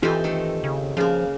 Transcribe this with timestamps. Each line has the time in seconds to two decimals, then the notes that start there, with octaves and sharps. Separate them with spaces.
0.03 E3 C4 D#4 F4 G4 A4
0.24 D#3 A3
0.64 C#3
0.97 C#3 F3 A#3